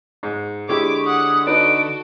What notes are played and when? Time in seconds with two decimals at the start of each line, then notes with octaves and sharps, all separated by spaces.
0.23 G#2
0.69 D3 G#3 E4 G4 C#5 D6
1.06 F#5 D#6
1.47 D#4 F#4 A4 B4 D5 D7